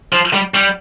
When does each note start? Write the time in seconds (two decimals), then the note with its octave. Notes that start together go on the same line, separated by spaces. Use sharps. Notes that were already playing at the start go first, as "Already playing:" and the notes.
0.13 F3
0.33 G3
0.54 G3